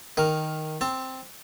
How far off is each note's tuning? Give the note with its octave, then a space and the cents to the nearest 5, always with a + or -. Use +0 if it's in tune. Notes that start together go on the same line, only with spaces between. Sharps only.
D#3 +0 A#4 +0
C4 +0 A5 +35